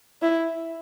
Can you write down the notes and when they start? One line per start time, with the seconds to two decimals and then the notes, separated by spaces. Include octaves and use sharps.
0.22 E4